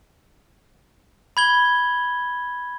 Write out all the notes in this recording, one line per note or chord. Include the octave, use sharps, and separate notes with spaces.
B5 G#6 G7